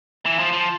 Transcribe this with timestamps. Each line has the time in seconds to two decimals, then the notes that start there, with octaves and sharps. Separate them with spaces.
0.26 E3
0.39 F3
0.53 F3